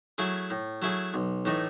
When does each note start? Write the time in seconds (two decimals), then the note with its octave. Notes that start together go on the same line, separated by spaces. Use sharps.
0.18 F#3 A3 E4 G#4
0.50 A2
0.82 F#3 A3 E4 G#4
1.14 B1
1.45 A2 E3 A3 D#4